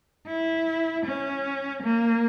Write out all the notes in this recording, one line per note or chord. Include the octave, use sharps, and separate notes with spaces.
E4
C#4
A#3